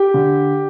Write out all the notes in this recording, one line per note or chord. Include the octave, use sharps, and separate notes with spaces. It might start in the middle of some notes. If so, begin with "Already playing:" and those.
Already playing: G4
D3